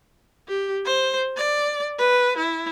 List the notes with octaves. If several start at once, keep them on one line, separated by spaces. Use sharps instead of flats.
G4
C5
D5
B4
E4